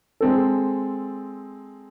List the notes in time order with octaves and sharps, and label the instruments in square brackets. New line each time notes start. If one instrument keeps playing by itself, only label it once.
[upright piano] G#3 C4 A4